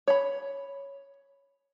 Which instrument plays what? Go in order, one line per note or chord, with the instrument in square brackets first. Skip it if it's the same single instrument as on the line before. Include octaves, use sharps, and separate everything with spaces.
[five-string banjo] C#5 B5